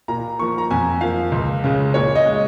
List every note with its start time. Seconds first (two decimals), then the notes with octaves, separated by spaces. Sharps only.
0.08 A#2 A#5
0.39 F3 A#3 C#6
0.58 A#5
0.71 F2 G#5
1.01 F3 A#3 F5
1.32 C#2
1.64 C#3 G#3
1.94 A#2 C#5
2.15 D#5
2.26 G#3